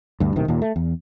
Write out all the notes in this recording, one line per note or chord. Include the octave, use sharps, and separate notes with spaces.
D2 G2
D#1 B1 C3 D#3
D#2 A#2
A3
E2